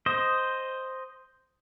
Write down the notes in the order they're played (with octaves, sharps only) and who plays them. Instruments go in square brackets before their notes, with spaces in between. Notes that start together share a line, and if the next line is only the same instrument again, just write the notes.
[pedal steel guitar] C5 D#5